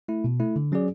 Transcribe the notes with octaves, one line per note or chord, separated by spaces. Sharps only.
A3 E4
B2
A3 E4
D3
F#3 C#4 G#4 D5